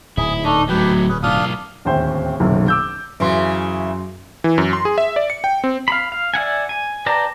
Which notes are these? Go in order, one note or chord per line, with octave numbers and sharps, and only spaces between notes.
D1 G#2 E4 G#4
A3 D4 D#4
F#3 A3 G4 B4 G5
C#4 G#4 B4
B1 D4 F4 F5 D#6
D1 D#2 C#4 C5 E5 G5
F#1 B1 F#2 C3 D#3
D6 E6 G6
F#2 C#3 E3 C6
E3
F#2
C6
G#4
E5
D5
C#7
G5
C4
F5 B5
F5
D5 E5 F#5 G#5
G#5
B4 D5 G5 A5 A#5